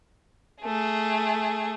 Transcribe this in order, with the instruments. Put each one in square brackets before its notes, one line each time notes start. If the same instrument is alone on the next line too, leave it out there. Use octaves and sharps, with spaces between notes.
[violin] A3 G#4